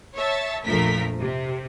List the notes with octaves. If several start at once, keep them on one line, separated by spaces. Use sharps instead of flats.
C#5 E5 A5
A#1 F2 F3 A3 A#4 B6
C3